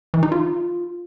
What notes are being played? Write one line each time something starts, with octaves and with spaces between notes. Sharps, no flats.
E3
D#4
F4